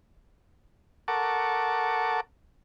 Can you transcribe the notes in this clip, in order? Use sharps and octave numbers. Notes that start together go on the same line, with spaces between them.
A4 A#4 F#5 A5 C#6 D6